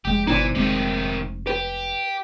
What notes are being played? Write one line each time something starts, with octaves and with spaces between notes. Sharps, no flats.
F1 G#3 G4
G1 B2 E3 D#4 C5 D5
F1 C3 D#3 G#3 C4
G4 B4